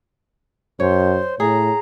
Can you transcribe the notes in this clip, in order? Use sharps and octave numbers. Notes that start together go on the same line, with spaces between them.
F#2 C5 C#5
A2 G#4 A#5